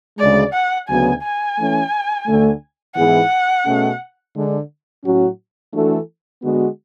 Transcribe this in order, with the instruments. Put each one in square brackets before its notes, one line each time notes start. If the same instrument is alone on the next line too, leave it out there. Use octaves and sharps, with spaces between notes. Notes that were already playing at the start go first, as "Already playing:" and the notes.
[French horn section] D2 C#3 G#3 [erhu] D5
[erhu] F#5
[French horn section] D2 C#3 F#3 B3 [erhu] G#5
[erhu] G#5
[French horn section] E3 A3 C#4
D2 D3 A3
[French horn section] G#2 E3 B3 E4 G#4 [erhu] F#5
[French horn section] B2 A3 C#4 G#4
D3 G#3 D4
A2 F#3 C#4 F#4
E3 A3 D4 F#4 A4
D3 G#3 B3 F#4